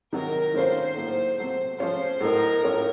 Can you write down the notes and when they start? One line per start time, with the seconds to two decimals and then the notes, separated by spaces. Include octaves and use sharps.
0.13 C3 D#3 F#3 A#4
0.54 D#3 A3 C#4 F4 C5
0.96 A2 F#3 A#3 F4 C5
1.38 C3 F#3 A3
1.79 F3 A3 C#4 F4 C5
2.21 A2 F#3 A3 D#4 A#4
2.63 A2 A3 C#4 F4